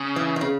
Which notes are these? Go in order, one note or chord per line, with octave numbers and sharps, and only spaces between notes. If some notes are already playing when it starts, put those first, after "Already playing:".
Already playing: C#3
E3
D#3
C#3